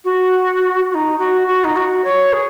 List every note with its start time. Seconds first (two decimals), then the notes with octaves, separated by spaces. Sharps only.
0.04 F#4
0.89 F#4
0.94 D#4
1.19 F#4
1.47 F#4
1.64 D#4
1.76 F#4
2.04 C#5
2.33 G#4